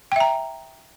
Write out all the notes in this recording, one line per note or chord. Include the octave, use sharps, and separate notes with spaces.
E5 G5 A#5